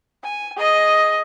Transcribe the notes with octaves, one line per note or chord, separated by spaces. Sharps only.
G#5
G#4 D#5